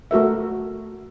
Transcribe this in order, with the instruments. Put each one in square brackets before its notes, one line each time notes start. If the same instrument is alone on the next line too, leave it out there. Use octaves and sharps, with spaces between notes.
[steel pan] A3 F#4 A#4 E5